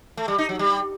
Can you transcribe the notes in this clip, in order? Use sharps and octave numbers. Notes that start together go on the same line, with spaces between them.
A3
G3
D#4
F#3
G3